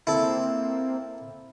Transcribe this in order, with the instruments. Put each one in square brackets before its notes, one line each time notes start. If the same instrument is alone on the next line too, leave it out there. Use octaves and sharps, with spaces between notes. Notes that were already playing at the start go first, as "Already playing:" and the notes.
[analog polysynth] A#3 C4 [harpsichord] E4 A4